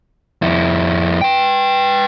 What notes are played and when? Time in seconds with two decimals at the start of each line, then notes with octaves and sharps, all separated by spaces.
0.42 F2 E4
1.21 B4 G5